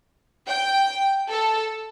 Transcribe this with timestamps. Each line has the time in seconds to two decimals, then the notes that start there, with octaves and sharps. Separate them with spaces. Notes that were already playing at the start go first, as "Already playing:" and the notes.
0.47 G5
1.29 A4